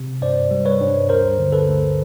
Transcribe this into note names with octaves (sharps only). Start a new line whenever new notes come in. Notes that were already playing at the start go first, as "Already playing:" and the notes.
Already playing: C3
G2 C5 D5
G3
B4 C#5
G2
D2 A#4 C5
D3
A4 B4
D2